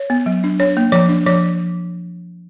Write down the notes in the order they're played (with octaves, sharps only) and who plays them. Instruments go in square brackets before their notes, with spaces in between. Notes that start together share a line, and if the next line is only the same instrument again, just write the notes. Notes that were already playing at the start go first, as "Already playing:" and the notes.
Already playing: [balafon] C#5
B3
F#3
D4
D4 C#5
A#3
F3 C#5
D4
F3 C#5